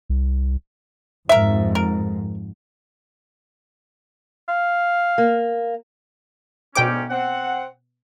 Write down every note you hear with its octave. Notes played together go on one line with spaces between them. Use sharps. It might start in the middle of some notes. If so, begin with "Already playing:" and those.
C2
F2 G#2 A#4 E5
A#4
F5
A#3
D2 G#2 B2 C#4 G5 D6
C4 F#5